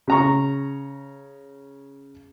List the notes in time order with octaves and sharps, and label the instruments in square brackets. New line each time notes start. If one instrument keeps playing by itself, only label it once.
[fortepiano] C#3 A#5 C#6